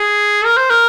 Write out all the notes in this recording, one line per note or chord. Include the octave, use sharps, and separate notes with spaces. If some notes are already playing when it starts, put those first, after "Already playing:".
Already playing: G#4
A#4
C5
A#4